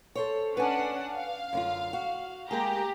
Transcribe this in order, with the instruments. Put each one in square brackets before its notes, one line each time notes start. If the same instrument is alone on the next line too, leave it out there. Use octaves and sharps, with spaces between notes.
[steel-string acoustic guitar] A4 C5 C#5
[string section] C#4 D4 F#5 [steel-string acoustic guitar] B4 G#5
[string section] F5
[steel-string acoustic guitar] F#2 D3 F4
F#4
[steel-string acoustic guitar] G#3 A#3 G#4 [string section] G4 A#5